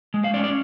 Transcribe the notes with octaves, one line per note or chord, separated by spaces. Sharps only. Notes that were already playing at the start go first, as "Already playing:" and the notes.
G#3
F5
C#4 D5
D5